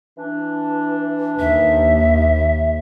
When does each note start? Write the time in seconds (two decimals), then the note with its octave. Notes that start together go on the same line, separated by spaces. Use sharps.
0.17 E3 D4
1.40 D#2 E5